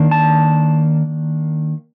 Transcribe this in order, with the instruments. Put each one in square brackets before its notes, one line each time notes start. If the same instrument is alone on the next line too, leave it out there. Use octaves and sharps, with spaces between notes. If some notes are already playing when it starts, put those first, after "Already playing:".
Already playing: [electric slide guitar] D#3 A#3 D4
A5